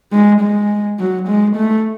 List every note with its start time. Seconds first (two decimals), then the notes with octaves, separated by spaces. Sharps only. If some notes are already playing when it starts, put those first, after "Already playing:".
0.12 G#3
0.41 G#3
0.99 F#3
1.28 G#3
1.56 A3